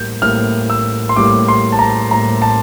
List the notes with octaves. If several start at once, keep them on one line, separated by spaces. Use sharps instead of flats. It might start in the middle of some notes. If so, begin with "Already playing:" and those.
Already playing: A2 G3 A#3 G6
A2 G3 A#3 F6
E6
C6
A2 G3 A#3 D6
C6
A5
A#5
A2 G3 A#3 A#5
A5